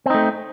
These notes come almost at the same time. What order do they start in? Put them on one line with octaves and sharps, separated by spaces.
C4 D#4 A3